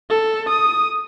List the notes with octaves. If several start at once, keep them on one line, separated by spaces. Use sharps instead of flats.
A4
D#6